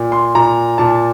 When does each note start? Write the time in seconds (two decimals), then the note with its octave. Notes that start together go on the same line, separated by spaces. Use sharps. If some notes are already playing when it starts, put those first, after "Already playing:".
Already playing: A#2
0.12 C6
0.35 A#2 A#5
0.78 A#2 A5